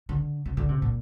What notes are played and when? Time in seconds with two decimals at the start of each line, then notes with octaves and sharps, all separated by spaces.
0.09 D3
0.46 C3
0.57 D3
0.69 C3
0.82 A#2